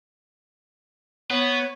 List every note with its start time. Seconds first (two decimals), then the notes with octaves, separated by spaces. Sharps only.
1.30 B3 C#5